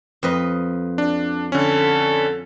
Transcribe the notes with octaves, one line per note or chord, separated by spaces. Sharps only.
F2 B4 D#5
D4
D3 C#4 A4